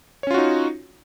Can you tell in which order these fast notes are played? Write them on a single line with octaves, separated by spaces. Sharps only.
C#5 C#4 F4 F#4 D#4